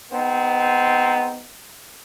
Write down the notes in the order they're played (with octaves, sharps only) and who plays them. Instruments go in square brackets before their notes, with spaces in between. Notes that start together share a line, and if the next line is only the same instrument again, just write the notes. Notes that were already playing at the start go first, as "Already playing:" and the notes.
[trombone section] G#2 B3 C4 D#4